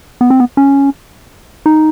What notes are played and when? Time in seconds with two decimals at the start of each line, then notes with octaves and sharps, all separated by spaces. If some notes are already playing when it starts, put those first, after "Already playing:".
0.21 B3
0.30 C4
0.40 B3
0.57 C#4
1.66 D#4